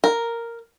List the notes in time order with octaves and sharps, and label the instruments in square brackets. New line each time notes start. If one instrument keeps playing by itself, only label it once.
[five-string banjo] A#4